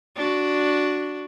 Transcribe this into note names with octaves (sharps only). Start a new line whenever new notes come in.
D4 F#4